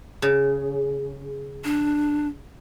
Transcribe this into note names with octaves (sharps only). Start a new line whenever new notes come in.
C#3
D4